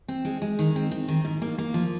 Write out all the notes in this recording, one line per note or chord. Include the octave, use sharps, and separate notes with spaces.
C4
G#3
G#3
D#3
C4
C4
D#3
G#2
A#3
A#3
F3